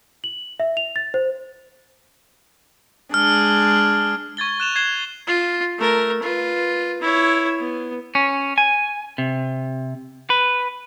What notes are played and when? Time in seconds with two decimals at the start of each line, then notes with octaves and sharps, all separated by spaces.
0.24 F#7
0.60 E5
0.77 F7
0.96 A6
1.14 C5
3.14 G#3 D4 G#4 F6
4.37 C#6 G#6 A6 G7
4.60 F#6 E7 F7
4.76 G#6 C7 E7 G7
5.27 F4
5.78 A3 A#4
6.22 F4 B4
7.01 E4 C#5
7.59 B3
8.15 C#4
8.58 G#5
9.18 C3
10.30 B4